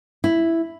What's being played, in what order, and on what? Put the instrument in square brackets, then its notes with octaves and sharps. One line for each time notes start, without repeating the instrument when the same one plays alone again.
[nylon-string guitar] E4